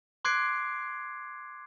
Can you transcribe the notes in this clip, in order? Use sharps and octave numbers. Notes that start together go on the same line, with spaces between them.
C6 D6 F#6 G#6 C7 D7